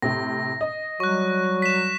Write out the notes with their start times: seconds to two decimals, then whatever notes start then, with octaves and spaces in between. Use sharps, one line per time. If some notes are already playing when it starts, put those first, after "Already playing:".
0.02 A2 C3 A#6
0.61 D#5
1.00 F#3 G3 C#6 F#6
1.62 B6 E7